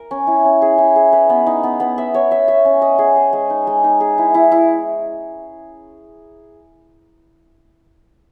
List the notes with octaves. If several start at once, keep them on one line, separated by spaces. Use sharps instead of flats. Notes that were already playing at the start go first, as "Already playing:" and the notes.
Already playing: A#4
C#4
E4
C#4
G#4
E4
G#4
B4
B3
D#4
B3
B3
E5
C#5
E5
E5
C#4
D#5
G#4
D#5
G#3
D#4
G#3
D#4
G#4
E4
E4
E4